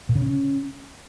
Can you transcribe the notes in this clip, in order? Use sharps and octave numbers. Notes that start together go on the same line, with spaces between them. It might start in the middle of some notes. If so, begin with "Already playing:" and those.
A#2
C#3
C#4